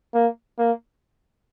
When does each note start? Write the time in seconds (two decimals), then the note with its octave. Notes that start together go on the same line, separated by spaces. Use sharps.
0.14 A#3
0.59 A#3